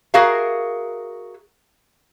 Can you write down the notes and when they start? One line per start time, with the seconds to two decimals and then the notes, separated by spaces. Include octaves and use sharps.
0.14 F#4 G#4 A#4 E5 F5